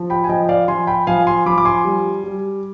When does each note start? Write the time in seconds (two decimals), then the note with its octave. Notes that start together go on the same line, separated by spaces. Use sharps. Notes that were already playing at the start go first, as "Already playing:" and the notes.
Already playing: F3
0.10 G5 B5
0.24 G#5
0.29 F3 D#5 G5
0.49 D5 F5
0.68 F3 G#5 C6
0.87 G5 B5
1.07 F3 F5 G#5
1.27 G#5 C6
1.46 F3 B5 D6
1.58 D6
1.65 G#5 C6
1.85 G3
2.24 G3